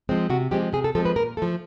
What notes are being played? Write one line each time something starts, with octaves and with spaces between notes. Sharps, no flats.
F3 G#3 C4
C3 F#4
F3 G#3 C4 G4
C3 G#4
A4
F3 G#3 C4 A4
B4
A#2 A#4
F3 A3 A4